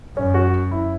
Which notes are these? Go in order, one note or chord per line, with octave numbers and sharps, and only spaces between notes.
F#2 C#4
F#4
E4